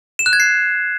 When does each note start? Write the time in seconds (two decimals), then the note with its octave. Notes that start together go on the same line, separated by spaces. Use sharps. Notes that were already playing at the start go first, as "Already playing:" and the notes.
0.19 E7
0.26 F#6
0.33 G#6
0.40 C7